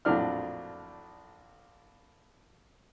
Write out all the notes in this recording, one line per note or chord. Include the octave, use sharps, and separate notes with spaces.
A#1 F2 A2 F#3 D4 F6